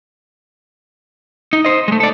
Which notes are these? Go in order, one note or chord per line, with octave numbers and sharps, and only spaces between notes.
D#4
C5 D#5
G#3 A3
A4 D5